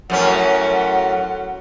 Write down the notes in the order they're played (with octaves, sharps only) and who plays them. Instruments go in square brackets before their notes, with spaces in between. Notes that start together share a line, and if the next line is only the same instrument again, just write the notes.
[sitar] F#2 A2 C#4 [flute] F#5